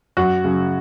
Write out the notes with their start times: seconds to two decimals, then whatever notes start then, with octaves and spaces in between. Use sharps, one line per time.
0.17 F#2 F#4
0.44 C#3 F#3